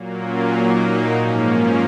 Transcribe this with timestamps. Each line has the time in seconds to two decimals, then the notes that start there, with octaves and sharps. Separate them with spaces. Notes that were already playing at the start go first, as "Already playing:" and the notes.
Already playing: A#2 F#3 A#3
0.22 C#4 F4
0.54 D#4
0.85 D#4
1.16 G#2 F3 A#3 C#4
1.47 C#4